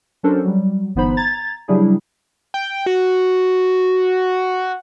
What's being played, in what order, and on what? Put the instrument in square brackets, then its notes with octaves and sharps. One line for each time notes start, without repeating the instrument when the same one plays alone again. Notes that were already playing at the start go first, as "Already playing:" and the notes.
[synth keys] F#3 C#4 D4 A4 A#4 C5
F#3 G3
G1 E3 B3 D#4 C5 B5
A#5 G#6 A6
C#3 F#3 G3 D4 E4 G#4
[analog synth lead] G5
F#4